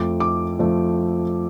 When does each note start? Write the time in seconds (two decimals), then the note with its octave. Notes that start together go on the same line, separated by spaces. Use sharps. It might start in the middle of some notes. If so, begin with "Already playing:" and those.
Already playing: F2 F3 A3 D6
0.20 D6
0.59 F2 F3 A3